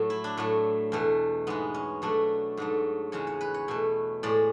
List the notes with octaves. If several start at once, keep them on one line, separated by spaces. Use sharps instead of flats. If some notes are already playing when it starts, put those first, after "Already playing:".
Already playing: A2 F#3 A3
E4
D4
A2 F#3 A3
E2 B2 A3
G#2 G#3 B3
C#4
B2 F#3 A3 D4
G#2 F#3 A3
E2 C#3 G#3 C#5
C#5
B4
C#5
B2 A3
A2 G#3 D5